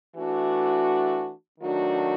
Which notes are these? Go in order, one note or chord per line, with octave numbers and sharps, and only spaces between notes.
E3 A3 D4 F#4
D#3 F#3 A3 D4 F#4